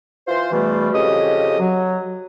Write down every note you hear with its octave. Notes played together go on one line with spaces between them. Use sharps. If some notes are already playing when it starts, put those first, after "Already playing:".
E3 F4 C5
E2 B2 E3 G3 A3
F2 C#3 G4 D#5 D#6
F#3